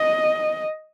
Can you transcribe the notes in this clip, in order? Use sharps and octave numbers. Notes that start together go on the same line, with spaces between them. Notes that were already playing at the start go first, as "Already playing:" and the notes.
Already playing: D#5